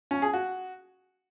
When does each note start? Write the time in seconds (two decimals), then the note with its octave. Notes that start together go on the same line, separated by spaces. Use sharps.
0.11 C#4
0.22 G#4
0.34 F#4